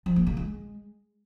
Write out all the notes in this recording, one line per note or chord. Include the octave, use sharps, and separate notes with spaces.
F3
A#3
C#3
G#3